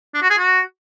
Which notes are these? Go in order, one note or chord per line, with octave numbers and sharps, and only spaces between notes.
D4
F#4
G#4
F#4